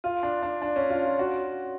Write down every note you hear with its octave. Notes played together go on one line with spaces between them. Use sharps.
F4
D4
D4
D4
C#4
F4
F4
F#4